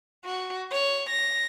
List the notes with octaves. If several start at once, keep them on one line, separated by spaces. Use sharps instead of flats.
F#4
C#5
A#6